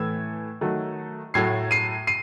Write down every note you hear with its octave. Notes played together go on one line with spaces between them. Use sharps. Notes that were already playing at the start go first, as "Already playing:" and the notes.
Already playing: A2 E3 A3 E6 G#6
D#3 F#3 A3
A2 F#3 A3 G#6 C7
C7 D#7
C7 D#7